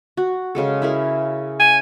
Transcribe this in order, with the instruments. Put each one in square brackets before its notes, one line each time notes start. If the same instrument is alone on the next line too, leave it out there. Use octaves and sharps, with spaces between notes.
[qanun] F#4
C#3 G#3 A4
E4 G#4 A#4
[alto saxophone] G#5